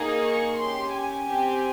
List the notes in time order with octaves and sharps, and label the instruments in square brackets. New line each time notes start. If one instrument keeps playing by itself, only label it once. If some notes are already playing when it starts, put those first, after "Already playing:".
Already playing: [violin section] A#3 D#4 G#4
C#6
C#4 G4 C6
G#5
C4 G4